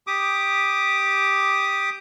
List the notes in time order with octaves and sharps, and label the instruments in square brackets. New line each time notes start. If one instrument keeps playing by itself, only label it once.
[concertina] G4 D6 D#6